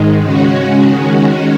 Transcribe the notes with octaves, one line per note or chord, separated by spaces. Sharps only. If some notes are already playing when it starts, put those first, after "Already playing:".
Already playing: G#2 D#3 G#3
C#3 G#3 C#4 F#4
D#3 G#3 C#4 F#4